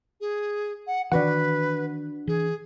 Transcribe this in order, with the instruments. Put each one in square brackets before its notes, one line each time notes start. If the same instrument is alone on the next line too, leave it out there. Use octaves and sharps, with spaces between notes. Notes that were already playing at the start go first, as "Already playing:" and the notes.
[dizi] G#4
F#5
[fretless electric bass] D#3 E3 [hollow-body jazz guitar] D4 F#4 F#5 [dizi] B4
[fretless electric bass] E3 [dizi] G#4